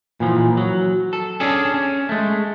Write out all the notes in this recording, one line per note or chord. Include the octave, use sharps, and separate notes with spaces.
A#2 E3 F3
F#3
A4
C#4 D4 G#4 A4
C#4
G#3 A3